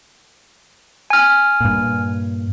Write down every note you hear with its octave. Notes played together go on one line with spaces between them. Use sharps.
G#5 F6
G2 A#2